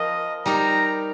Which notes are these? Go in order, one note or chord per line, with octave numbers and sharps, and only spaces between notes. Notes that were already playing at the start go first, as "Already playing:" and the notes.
Already playing: F3 C4 F4 A#4 D#5
G3 D#4 G4 A#4 A#5